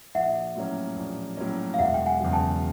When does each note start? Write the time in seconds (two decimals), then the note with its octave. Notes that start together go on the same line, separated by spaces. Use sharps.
0.15 A#1 E5 F#5
0.56 A2 F#3 A#3 C#4
0.97 A#1
1.37 A2 F#3 A#3 C#4
1.74 F5
1.79 E1 E5 F#5
1.94 G5
2.06 F#5 G#5
2.20 E2 C#3 F#3
2.33 G5 A5